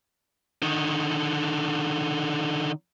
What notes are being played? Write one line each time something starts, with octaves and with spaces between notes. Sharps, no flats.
D3 D#3